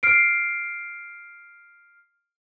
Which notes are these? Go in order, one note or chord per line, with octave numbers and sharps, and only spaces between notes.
F6 C7 D7